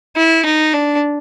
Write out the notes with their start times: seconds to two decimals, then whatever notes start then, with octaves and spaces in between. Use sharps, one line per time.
0.17 E4
0.45 D#4
0.74 D4